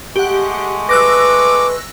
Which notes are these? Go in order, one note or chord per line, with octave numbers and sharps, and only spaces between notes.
G#3 A3 G4 F#5 C#6
B4 D6 E6 F#6 A#6